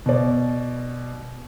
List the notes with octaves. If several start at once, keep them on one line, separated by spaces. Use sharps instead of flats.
B2 D5